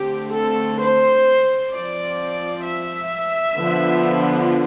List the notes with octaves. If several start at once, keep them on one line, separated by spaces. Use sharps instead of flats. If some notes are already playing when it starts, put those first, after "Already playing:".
Already playing: D3 A3 C4 G4
A4
C5
F3 C4 D5
E5
D3 F3 B3